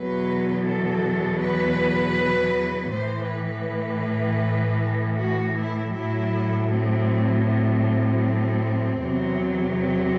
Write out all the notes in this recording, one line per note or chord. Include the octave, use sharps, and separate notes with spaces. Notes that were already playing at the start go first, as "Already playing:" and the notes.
Already playing: E2 B2 F#3 B4
A4
B4
A2 E3 C5
B4
F#4
E4
A2 F#3 E4
C4
C4
E2 C3 F#3
C4